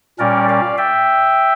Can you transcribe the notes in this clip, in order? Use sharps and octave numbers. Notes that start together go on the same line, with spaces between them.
A#2 G3 C#4 A#4 D5
D5 F5
E5 G5